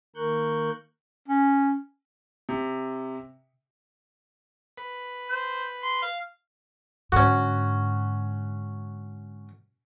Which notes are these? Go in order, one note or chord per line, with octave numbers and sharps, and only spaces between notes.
D#3 A#3 A#4 C#6 F#6 G6
C#4
C3
B4
C5
C6
F5
G#2 D3 C#4 F#4